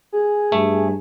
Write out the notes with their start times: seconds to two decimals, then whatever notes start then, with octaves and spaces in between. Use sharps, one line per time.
0.12 G#4
0.52 G2 A3